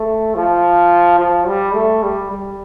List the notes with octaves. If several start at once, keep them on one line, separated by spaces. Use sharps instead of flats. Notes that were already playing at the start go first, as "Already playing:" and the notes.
Already playing: A3
F3
F3
G3
A3
G3
G3